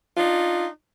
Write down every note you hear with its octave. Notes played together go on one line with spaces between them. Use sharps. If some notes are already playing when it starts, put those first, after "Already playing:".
D4 D#4 F4